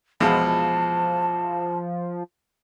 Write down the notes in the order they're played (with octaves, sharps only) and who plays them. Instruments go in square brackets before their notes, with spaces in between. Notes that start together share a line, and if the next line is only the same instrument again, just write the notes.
[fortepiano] E2 B2 G#3 [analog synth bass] F3 [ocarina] A5